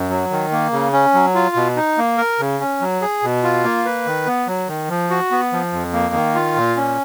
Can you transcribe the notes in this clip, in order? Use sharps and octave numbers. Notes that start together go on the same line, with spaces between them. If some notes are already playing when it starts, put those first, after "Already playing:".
Already playing: F#2
F#3
D#3
A#3
C#3
C#4
F#3
F4
B2
D#4
A#3
A#4
C#3
C#4
F#3
G#4
B2
F4
A#3
B4
D#3
B3
F#3
D#3
F3
F#4
B3
F3
F2
A#3
D#3
F4
A#2
C#4